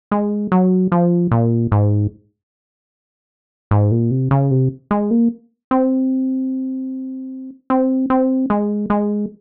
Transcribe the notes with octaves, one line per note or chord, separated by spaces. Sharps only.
G#3
F#3
F3
A#2
G#2
G#2
A#2
C3
C#3
C3
G#3
A#3
C4
C4
C4
G#3
G#3